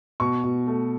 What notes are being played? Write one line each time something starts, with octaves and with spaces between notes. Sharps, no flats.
B2 C#6
B2
A3